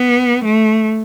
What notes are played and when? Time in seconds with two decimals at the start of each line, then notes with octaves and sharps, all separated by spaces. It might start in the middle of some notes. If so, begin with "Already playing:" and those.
Already playing: B3
0.44 A3